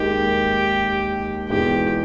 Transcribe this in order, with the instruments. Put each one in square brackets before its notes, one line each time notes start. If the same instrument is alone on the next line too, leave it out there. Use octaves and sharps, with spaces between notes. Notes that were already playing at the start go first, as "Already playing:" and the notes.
Already playing: [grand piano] D#2 D#3 G#3 [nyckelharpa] G4
[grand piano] E2 B2 G#3 D#4 [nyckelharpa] G4